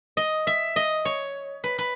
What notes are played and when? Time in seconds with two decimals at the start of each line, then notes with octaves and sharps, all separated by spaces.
0.17 D#5
0.47 E5
0.76 D#5
1.05 C#5
1.64 B4
1.78 B4